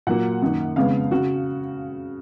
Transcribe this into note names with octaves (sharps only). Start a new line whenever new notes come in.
A#2 F#3 A#3 F#5
F#2 D#3 A#3
F2 C#3 G#3 B3 F5
C#3 F#4